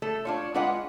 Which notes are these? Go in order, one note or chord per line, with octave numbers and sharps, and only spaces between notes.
A3 A4
D4 F4 C#5
G#3 D4 F4 B4 D#5 F#5